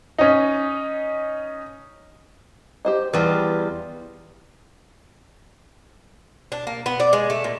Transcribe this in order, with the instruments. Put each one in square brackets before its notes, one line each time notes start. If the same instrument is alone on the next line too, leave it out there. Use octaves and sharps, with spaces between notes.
[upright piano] C#4 D#4
[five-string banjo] G4 C5 D#5
[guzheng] E2 G3 F4 [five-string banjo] B4
[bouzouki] D4
A#3
B3
D5
G#3
A3
A#2